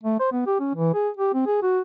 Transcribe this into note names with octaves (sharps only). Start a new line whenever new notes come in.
A3
C5
B3
G4
C#4
E3
G#4
G4
C4
G#4
F#4